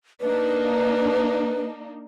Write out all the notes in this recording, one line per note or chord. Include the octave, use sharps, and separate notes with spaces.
A#3 D4 D#4 B4